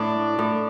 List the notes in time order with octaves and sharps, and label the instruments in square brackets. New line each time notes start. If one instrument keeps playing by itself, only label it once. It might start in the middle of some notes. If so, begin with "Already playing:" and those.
Already playing: [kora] A2 A3 [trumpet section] D4
[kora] A2